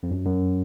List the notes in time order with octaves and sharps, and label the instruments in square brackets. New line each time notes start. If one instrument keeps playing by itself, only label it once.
[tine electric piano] F2
F#2
F#2